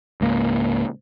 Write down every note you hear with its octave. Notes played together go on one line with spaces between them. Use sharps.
C#2 G#2 A#3